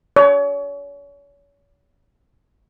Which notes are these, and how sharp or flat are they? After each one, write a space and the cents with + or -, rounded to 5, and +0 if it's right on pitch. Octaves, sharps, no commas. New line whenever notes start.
C#5 +35